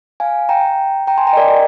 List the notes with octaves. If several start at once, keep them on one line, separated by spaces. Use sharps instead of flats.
F5 G#5
G5 A#5
G5 A#5
G#5 C6
G5 A#5
D#5
A#4 D5